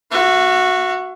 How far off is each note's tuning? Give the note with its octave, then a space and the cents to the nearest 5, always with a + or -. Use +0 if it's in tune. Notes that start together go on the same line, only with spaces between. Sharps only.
F#4 -10 E5 +35